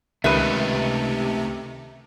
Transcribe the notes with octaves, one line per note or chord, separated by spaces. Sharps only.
C#2 C3 D#3 A3 D#4 B4 E5